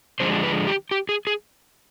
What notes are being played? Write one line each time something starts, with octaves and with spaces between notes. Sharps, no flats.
D3 F3 G#3 D4 C5
B4
G4
G4
G#4
G#4